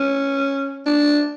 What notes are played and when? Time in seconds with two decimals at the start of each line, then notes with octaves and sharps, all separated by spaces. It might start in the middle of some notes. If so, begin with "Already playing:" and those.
Already playing: C#4
0.86 D4